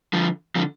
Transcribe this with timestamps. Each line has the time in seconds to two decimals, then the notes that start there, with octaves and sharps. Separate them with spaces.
0.13 D3 F3
0.55 D3 F3